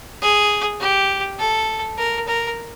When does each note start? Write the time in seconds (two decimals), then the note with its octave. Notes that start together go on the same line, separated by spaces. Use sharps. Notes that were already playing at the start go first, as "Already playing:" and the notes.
0.22 G#4
0.80 G4
1.39 A4
1.98 A#4
2.27 A#4